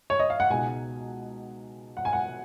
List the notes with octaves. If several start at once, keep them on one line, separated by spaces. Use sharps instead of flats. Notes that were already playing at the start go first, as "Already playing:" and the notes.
C#5
D#5
F5
F#5
C#2 B2 G#3 D#4 G#5
F#5
G#5
F#5